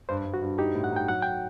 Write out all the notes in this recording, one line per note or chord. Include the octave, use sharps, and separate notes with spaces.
G2 C5
G2
F#4
G2
D#4 G4
A2
F#5
D#4 G5
F#3 F#5
G5